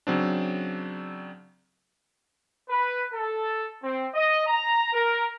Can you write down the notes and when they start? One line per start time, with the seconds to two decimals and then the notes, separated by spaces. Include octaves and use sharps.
0.07 C#3 F#3 C4 D4
2.69 B4
3.14 A4
3.83 C4
4.14 D#5
4.46 A#5
4.93 A#4